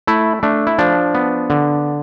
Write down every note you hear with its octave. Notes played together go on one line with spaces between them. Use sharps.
A3 E4
A3 D4
E4
F3 D4
B3
D3